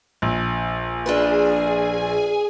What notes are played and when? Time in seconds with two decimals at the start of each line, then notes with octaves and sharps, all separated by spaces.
0.22 A#1
1.06 D4 F4 G#4 B4 G#5